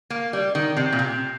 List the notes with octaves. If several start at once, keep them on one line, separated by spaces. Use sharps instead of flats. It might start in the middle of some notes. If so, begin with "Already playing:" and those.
A#3
G3
D#3
C3
A#2
C3